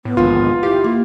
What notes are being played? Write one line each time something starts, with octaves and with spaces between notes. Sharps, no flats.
A2 B3
A#1 D#2 G#2 D3 F4
E4 G4 F5
A#3